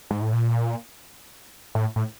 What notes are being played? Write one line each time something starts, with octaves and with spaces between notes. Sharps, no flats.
G#2
A2
A#2
A2
A2